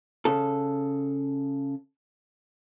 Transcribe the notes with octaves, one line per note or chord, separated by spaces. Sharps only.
C#3 A4